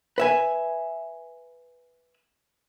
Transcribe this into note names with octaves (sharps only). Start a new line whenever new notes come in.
B4 E5 G#5